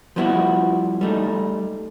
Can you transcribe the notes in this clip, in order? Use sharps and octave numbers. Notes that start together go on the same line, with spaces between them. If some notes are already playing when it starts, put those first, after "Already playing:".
F3 G3 B3 E4 F#4
G3 A3 D#4